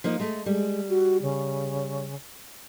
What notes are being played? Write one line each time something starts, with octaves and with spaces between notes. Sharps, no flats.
F3 A#3 D#4
G#3 A3
G3 G#3
F#4
C#3